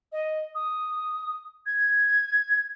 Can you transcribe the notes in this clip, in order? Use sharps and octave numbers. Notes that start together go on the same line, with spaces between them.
D#5
D#6
G#6